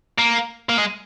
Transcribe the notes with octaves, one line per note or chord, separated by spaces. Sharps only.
A#3
A#3
G#3